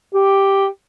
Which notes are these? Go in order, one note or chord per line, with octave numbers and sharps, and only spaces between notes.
G4